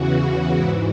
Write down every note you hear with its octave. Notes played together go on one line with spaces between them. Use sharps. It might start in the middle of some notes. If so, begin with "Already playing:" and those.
Already playing: E2 C#3 E3 F#4
G#2 E3 E4